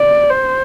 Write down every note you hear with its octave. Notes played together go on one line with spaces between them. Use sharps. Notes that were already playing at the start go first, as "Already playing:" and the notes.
Already playing: D5
C5